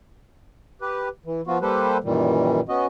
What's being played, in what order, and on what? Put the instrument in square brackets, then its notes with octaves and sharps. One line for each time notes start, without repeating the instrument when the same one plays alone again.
[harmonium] G4 B4
E3
F3 B3 F4 F#4
G3 A#3 G4 A4 B4 C5
F#2 A#2 D#3 E3 G3
B3 C#4 F#4 D#5